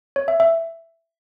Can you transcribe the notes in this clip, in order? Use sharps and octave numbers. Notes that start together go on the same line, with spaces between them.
C#5
E5
E5